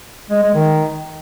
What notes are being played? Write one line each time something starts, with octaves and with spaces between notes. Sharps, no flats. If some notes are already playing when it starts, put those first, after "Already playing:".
G#3
G#3
D#3